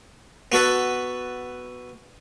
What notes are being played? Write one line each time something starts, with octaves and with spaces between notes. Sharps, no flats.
B3 F#4 A4 B4